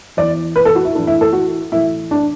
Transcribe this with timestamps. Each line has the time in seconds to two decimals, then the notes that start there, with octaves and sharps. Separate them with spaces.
0.17 E2 E3 D5
0.56 B4
0.65 A4
0.75 F#4
0.85 E4
0.95 A2 D4
0.98 E3
1.07 E4
1.21 A4
1.33 F#4
1.72 A2 E3 E4
2.11 D4